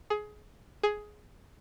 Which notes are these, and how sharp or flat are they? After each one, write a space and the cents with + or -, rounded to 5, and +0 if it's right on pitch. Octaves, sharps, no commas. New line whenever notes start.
G#4 +20
G#4 +10